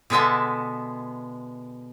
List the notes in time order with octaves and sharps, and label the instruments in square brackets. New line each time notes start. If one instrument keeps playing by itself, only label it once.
[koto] B2 D3 G#3 B3 E5 A5